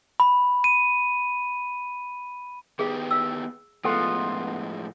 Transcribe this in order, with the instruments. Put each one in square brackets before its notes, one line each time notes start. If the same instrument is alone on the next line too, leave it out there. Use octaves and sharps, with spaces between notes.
[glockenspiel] B5
D#7
[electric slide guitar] D#3 B3 G4 [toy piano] G#4 F5
[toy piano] F5 E6
[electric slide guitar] A2 F3 G#3 [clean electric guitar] B3 F4 [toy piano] A4